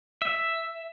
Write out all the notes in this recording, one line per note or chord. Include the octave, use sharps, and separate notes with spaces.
E5